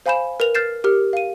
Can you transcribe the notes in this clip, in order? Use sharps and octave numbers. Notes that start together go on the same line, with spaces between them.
C5 F5 G#5 B5 G6 E7
A#4 B4 F7
F6 G6 A6 C7 E7
G4 A#4 F6
F5 D#7